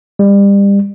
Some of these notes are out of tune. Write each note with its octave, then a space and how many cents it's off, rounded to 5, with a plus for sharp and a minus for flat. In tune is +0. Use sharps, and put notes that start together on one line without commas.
G3 +30